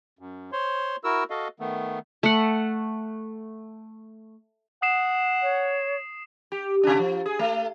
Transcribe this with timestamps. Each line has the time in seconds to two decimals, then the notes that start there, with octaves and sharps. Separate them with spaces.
0.19 F#2
0.52 C5 C#5 C6
1.04 E4 F#4 A#4 E6
1.30 F#4 A4 D#5 F5
1.60 D#3 A3 B3
2.23 A3 F#5
4.82 F#5 D#6 C7 E7
5.42 C#5
6.52 G4
6.83 C3 D4
6.99 F3
7.26 G#4
7.39 A3